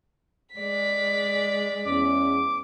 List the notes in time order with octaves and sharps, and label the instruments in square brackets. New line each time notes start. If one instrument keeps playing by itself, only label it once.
[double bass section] G#3 [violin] D5 B6
[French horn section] E2 C#4 [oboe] D6